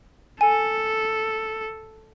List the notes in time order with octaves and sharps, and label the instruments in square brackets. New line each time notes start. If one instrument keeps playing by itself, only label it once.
[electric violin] A4 [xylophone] G#5